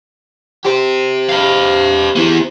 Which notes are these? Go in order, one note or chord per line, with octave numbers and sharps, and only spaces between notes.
G4 C5
B4 F5
B3 E4